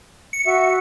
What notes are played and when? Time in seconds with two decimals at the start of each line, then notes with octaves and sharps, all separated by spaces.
0.33 C#7
0.46 F#4 E5